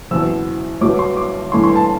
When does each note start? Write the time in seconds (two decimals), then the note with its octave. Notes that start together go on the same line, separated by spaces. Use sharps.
0.11 F#1 E2 B2 E6
0.81 G1 G2 F#3 D6
0.99 C6
1.17 D6
1.52 G2 E3 A3 E4 C6
1.64 C6
1.76 A5